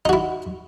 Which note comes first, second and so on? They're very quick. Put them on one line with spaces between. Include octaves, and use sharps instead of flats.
D#4 F#4 E4